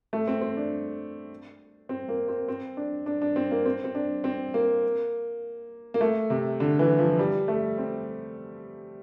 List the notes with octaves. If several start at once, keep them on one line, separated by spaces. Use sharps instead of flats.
A3
C4
C4
D4
C4
A#3
C4
C4
D4
D4
D4
C4
A#3
C4
C4
D4
C4
A#3
A#3
A3
C3
D3
E3
F3
G3
A3
C4